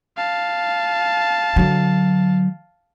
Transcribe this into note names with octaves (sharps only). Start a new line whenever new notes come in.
F5 A5
D3 F#3